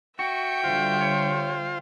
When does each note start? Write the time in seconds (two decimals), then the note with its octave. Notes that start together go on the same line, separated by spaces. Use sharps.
0.19 F#4 E5 G5 C#6
0.64 D3 G3 F4 C5
1.01 C#5